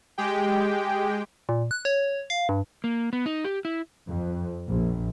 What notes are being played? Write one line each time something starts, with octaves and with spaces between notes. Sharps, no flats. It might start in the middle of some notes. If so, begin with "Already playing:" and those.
G#3 G4 G5
A#2
F#6
C#5
F5
G2
A#3
B3
D#4
G4
E4
F2
A#1